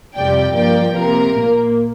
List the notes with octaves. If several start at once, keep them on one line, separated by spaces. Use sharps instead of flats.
F2 C3 G3 D5 G5
G2 F3 A#3 D5 G5
C3 A#3 A#4
A#2 A#3